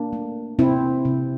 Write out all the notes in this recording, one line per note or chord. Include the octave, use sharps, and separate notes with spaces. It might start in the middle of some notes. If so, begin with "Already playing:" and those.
Already playing: A#3 D4
A3
C3 C4 E4
C3